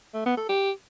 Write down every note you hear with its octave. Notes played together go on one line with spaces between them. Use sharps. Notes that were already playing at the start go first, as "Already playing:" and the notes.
A3
B3
A4
G4